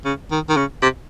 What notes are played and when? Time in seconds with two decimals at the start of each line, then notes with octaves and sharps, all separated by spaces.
0.05 C#3
0.31 D#3
0.49 D#3
0.57 C#3
0.82 C3